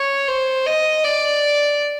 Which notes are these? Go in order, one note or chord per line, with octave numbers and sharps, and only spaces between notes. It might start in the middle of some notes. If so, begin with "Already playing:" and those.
Already playing: C#5
C5
D#5
D5